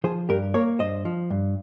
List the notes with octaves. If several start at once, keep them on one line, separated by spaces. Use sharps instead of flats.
F3 G#4 C5
G2 G4 A#4
A#3 A#4 C#5
G2 C5 D#5
F3
G2